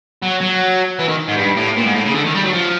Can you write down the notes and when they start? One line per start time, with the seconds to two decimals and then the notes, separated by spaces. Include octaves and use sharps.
0.22 F#3
0.41 F#3
0.99 E3
1.08 D#3
1.28 G#2
1.37 G2
1.56 A2
1.77 A#2
1.85 G#2
1.95 A2
2.05 C#3
2.14 D3
2.25 D#3
2.35 G3
2.44 F#3
2.53 F3